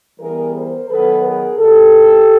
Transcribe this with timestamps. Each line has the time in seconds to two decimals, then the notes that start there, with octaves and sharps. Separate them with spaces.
0.20 E3 G3 B3 G#4 A#4
0.54 A#4 C5
0.89 D#3 F#3 B3 A4 B4
1.23 G#4 A#4
1.58 B2 G3 B3 G4 A4